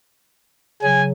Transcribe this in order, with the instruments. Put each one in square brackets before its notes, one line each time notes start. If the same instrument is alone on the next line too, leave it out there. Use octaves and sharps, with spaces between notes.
[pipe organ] C#3 F#3 [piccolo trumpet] G#5